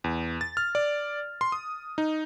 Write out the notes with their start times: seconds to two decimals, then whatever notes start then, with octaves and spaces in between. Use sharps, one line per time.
0.04 E2
0.41 A6
0.57 F6
0.75 D5
1.41 C6
1.52 D#6
1.98 D#4